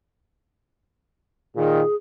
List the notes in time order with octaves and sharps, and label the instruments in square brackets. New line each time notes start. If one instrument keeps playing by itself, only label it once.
[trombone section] A#2 D#3 [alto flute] G#4